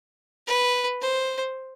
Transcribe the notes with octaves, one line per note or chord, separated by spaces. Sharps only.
B4
C5